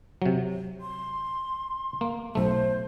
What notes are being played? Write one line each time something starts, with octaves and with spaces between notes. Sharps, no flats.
C3 F#3
C6
A#3
B1 A3 C5